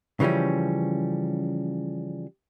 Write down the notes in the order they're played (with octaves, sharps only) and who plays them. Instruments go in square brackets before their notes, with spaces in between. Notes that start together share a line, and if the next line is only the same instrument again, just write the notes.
[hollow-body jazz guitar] C#3 E3 F3 G3 C#4